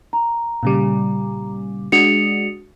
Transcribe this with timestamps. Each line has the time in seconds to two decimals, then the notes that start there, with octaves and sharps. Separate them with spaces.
0.13 A#5
0.63 A#2 C#3 G3
1.92 G#3 D4 F#4 C#7 F7